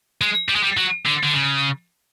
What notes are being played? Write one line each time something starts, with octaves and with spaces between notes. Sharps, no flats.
G#3
G3
G#3
G3
F#3
D3
D3
C#3